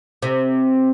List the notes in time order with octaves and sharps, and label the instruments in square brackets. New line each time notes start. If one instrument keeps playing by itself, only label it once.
[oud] C3